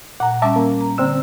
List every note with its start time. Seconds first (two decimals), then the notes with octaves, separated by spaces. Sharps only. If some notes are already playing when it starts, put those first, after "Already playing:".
0.20 A#2 F#5 A#5
0.42 G3 C#4 E5 A5 D6
0.56 A#3
0.81 A#5
0.98 D3 A#3 C4 E6